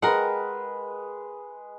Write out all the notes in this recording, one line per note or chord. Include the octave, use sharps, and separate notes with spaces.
G#3 A#4 B4 F#5